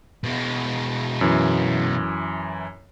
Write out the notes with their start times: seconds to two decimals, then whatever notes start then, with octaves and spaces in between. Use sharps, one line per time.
0.24 B2 G#3
1.21 F#2 E3